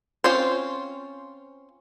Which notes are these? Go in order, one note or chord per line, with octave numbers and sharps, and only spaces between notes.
C4 C#4 F4 C5